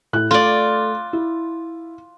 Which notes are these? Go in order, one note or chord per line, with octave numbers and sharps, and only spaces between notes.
A2 F#6
A3 F4 D5
E4